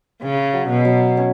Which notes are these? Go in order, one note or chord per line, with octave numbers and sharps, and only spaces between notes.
C#3 C#4
F#3
B2
F#3
C#4